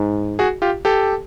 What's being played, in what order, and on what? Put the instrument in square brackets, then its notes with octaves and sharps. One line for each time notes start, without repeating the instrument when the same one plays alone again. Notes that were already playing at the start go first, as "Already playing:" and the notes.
Already playing: [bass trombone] G#2
[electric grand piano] F#4 G#4
F4 G4
G4 A4